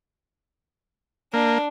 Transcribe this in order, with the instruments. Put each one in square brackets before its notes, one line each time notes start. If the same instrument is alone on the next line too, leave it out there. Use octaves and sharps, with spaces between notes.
[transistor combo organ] A#3 [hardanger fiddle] D4